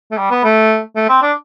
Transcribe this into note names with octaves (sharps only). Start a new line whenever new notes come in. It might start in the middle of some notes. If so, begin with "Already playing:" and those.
A3
G3
B3
A3
A3
C4
D4